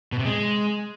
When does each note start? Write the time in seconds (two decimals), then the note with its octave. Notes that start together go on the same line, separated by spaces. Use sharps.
0.12 B2
0.19 C3
0.26 G#3